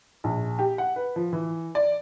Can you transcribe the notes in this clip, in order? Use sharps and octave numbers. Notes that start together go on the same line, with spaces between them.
A#1
G4
F#5
B4
F3
E3
D5